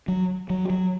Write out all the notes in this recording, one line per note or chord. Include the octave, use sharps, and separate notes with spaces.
F#3
F#3
F#3